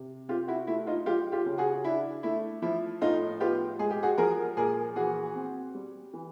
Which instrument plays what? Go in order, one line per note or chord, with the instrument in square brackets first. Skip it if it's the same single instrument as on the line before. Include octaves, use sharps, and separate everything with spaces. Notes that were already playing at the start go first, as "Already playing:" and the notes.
Already playing: [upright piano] C3
C4 F4 G4
E4 F#4
A3 E4
D#4 F4
F#3 F4 G4
F4 G4
C#3
F#4 G#4
D4 E4
A3 E4
F3 E4
A2 D#4 F4
B3 F4 G4
G#3 G#4
G4
F#4 G#4
F3 G#4 A#4
A#2 G#4 A#4
E3 F#4 G#4
C4
G3
E3